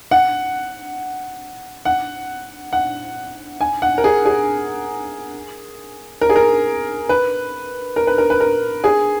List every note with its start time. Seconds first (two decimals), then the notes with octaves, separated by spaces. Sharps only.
0.11 F#5
1.85 F#5
2.73 F#5
3.61 G#5
3.82 F#5
3.98 A#4
4.04 G#4
4.25 G#4
6.21 A#4
6.30 G#4
6.36 A#4
7.09 B4
7.96 A#4
8.07 B4
8.18 A#4
8.30 B4
8.40 A#4
8.84 G#4